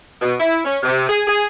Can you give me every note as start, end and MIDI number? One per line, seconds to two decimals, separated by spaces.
0.21 0.33 47
0.40 0.60 64
0.65 0.77 61
0.83 1.07 48
1.09 1.21 68
1.27 1.45 68